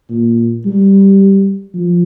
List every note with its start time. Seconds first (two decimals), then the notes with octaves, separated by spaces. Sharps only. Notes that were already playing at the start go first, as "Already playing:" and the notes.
0.10 A#2
0.66 G3
1.74 F3